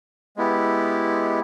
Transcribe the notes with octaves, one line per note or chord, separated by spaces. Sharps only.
G#3 B3 E4 G4